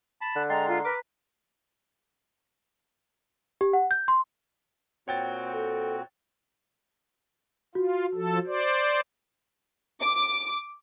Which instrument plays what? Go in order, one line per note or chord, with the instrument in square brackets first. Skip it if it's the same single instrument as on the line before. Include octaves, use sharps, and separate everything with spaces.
[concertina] A5 B5
[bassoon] D3 [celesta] F#6
[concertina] G#3 C6 [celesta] D#5 G5 A6 [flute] A#5
[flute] F4 [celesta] A#5
[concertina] A#4 D6 [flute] B4
[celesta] G4
F#5
G6
C6
[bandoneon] A#2 C4 F#4 [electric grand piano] C#5 G5 A6
[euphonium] A4
[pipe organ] F4 [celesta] F#4
[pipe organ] F3 A4
C5 D5
[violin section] D6